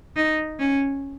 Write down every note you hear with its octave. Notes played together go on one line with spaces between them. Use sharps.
D#4
C#4